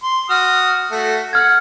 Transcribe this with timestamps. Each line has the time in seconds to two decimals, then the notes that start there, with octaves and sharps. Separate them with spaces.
0.03 C6
0.30 F#4 D#6 F6
0.91 A3 F#4
1.33 F#5 F6 G#6